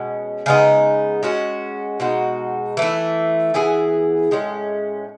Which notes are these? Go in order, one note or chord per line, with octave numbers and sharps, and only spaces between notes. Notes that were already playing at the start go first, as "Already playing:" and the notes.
Already playing: B2 G#3 C#4
C#3 G#3 B3 D#4
G#3 C#4 F#4
B2 G#3 D#4 F#4
E3 A3 E4
E3 B3 E4 G#4
A2 G#3 C#4